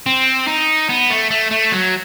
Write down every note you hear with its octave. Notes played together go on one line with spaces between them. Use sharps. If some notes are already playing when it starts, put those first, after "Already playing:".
C4
D#4
B3
A3
A3
A3
F#3